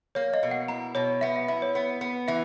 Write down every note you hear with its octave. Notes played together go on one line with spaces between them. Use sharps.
A#3 C#5
D#5
B2
F#5
E4 A#5
B2 C#5
B3 E5
E5
E4 E5
C#5
B3
B3
E3 E5